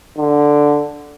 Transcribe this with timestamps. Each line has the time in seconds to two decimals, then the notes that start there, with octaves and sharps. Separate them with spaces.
0.18 D3